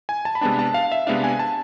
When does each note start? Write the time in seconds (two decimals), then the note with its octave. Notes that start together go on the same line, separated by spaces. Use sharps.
0.09 G#5
0.25 A5
0.35 B5
0.41 C3 G#3 B3 D4 A5
0.59 A5
0.74 F5
0.92 E5
1.07 C3 G#3 B3 D4 F5
1.24 G#5
1.39 A5